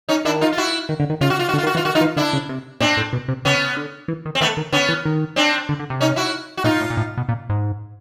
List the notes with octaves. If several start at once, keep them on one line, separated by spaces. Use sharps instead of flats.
C#4 D#4
D#3 D4 E4
D#4 F4
F4
E4 F#4
D#3
D3
D#3
C#3 F4
F#4
F4
F#4
D3
F4
D#3
F#4
E3 F4
D#3 F#4
D#4 F4
E3
D3 D4 E4
C#3
C3
A#2 C4 D4
A2
B2
C3
C#3 B3 C#4
D3
E3
D#3
C4
D#3 A3 B3
D#3
D3 B3 C#4
E3
D#3
C4 D4
D3
D3
C3
C#4 D#4
E4 F#4
F#4
A#2 D#4 F4
A2
A#2
A2
B2
A#2
G#2